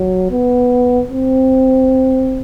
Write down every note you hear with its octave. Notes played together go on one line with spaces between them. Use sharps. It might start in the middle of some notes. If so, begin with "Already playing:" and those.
Already playing: F#3
B3
C4